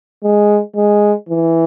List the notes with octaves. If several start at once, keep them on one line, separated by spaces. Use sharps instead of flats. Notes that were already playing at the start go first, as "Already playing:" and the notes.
G#3
G#3
E3